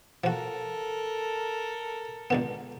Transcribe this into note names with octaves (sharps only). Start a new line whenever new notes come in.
F3 F#4 A4 A#4
C#2 D3 B3